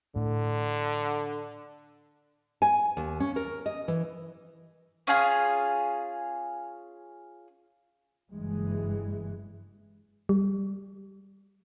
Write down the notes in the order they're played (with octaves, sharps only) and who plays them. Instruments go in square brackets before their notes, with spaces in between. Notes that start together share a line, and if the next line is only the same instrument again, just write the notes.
[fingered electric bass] A2 [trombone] D3
[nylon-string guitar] G#5
D#2
C#4
A#4
D#5
E3
[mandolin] C#4 F4 G#4 F5
[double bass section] F#1 G2 E3 G#3
[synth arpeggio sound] G3